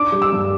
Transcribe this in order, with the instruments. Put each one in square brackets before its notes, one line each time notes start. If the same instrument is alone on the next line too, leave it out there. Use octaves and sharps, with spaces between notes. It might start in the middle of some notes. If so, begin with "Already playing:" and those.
Already playing: [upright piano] D4 [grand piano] D6
[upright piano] G3
[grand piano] E6
[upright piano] G2